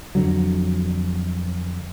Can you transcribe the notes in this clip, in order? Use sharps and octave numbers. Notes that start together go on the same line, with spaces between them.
F2 D3 F#3